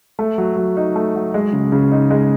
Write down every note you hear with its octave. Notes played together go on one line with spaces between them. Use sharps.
A3
F#3
F#3
D#4
A3
F#3
G#3
C#3
C#3
D#4
G#3